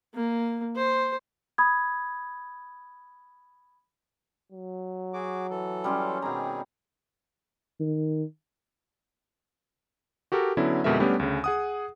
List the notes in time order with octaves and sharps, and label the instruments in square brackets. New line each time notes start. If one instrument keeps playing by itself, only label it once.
[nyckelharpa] A#3
C5
[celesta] B5 D#6 G#6
[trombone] F#3
[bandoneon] F#4 G#4 D6
E3 A4
[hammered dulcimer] G3 C#4 C6
[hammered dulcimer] B2 A#5 [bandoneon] D#3 C4 G#4
[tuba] D#3
[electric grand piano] F#4 G4 A4 A#4
D3 F#3 B3 C#4 E4
F2 B2 D3 G#3 A#4 E5
G3 A3 B3 C#4 D4 G4
D2 C#3
G#4 F#5 D#6